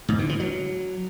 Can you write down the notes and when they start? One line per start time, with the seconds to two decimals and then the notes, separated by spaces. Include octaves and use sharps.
0.09 G#2
0.19 D3
0.29 E3
0.40 F#3